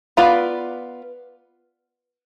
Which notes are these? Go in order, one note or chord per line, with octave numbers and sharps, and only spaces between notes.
B3 F4 B4 D5